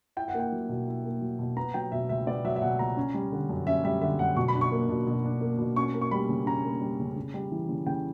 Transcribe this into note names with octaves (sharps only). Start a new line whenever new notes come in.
E4 G5
F#5
A#3 G5
F#3
B2
E4
A#3
F#3
B2
B3 A#5
F#3 G5
B2 E5
C#2 E5
B3 D5
F#3 E5
E5
B2 F#5
C#2 A#5
C#4
G3
D3
F#2
C#4 E5
G3 E5
D3 E5
F#2 F#5
B2 C#6
B5
D4
C#6
A#3
B2
B2
D4
A#3
B2
C#4 C#6
A#3
C#6
G3 B5
C#3
C#4 A#5
A#3
G3
C#3
C#3
G3
E3
C#3
C#3 G5